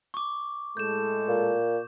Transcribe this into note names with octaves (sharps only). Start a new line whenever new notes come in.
C#6 D6
A2 G#3 A4 G6 E7
A#2